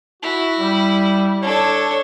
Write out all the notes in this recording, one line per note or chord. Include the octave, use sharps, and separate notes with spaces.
E4 F#4
G3
D4 A4 C#5